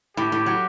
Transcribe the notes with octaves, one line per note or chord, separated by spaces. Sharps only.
A2 G4
A2
F#3